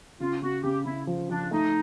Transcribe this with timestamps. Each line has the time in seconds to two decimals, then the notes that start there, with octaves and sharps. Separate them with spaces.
0.20 C#3 F4
0.42 C#3 F#4
0.63 C#3 G4
0.85 C#3 E4
1.07 F3
1.29 F3 D4
1.51 A3 D#4